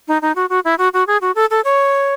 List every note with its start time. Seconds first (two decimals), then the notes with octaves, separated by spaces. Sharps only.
0.08 D#4
0.22 D#4
0.36 F#4
0.50 F#4
0.65 E4
0.78 F#4
0.94 F#4
1.07 G#4
1.21 F#4
1.35 A4
1.51 A4
1.64 C#5